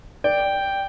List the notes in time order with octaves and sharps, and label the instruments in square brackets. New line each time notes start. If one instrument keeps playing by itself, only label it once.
[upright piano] D5 [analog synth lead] G5